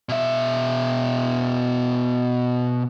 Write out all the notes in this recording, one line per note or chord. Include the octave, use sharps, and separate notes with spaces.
B2 E5